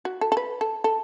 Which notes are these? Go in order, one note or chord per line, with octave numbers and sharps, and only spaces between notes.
F#4
A4
A4
B4
A4
A4